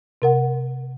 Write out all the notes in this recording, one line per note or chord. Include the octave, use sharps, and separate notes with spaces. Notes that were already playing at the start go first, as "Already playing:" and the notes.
C3 A#4 F#5